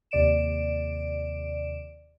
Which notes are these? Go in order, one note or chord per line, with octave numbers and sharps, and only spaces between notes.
D#2 C3 D5 D7 E7